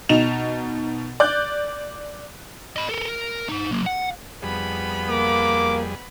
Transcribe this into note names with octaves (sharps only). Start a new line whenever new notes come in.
B2 D#4 E7 F7
D5 F#6 G6
D#5 B5
A4 A#4
A#4
D#4 C5
F#3 A#3
F#5
F2 G3 B3 G#4 B5
A#3 D6